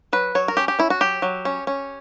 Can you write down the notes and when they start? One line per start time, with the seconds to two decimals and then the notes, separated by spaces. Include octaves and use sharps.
0.13 F#3 B4
0.35 F#3 C#5
0.48 A#4
0.57 C#4 G4
0.68 G4
0.79 C#4 E4
0.90 F#4
1.01 F#3 G4
1.22 F#3
1.45 C#4
1.67 C#4